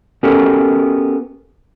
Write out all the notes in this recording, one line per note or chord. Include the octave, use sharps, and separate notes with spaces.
B3 C#4 F#4 G4 A4 A#4